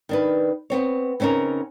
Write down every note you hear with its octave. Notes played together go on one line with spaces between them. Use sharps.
D#3 D4 B4
B3 C4 C#5
C#3 C4 C#4 D#4 A#4